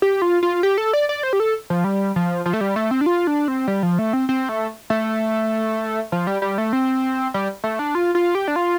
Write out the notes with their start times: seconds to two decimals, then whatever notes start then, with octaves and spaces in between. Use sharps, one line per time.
0.02 G4
0.22 F4
0.43 F4
0.63 G4
0.78 A4
0.93 D5
1.09 D5
1.23 C5
1.33 G4
1.40 A4
1.70 F3
1.84 G3
2.16 F3
2.46 F3
2.53 A3
2.61 G3
2.76 A3
2.91 C4
3.01 D4
3.06 F4
3.27 D4
3.48 C4
3.68 G3
3.83 F3
3.99 A3
4.13 C4
4.29 C4
4.49 A3
4.90 A3
6.12 F3
6.27 G3
6.42 G3
6.58 A3
6.73 C4
7.34 G3
7.64 A3
7.79 D4
7.95 F4
8.15 F4
8.35 G4
8.48 D4
8.56 F4